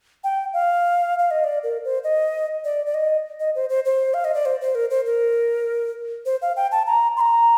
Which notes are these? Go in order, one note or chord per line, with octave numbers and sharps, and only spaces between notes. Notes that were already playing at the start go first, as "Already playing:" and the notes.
G5
F5
F5
D#5
D5
A#4
C5
D#5
D5
D5
D#5
D#5
C5
C5
C5
F5
D#5
D5
C5
C5
A#4
C5
A#4
C5
F5
G5
A5
A#5
C6
A#5